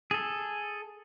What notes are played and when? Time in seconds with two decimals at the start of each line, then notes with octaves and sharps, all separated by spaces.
0.11 G#4 A4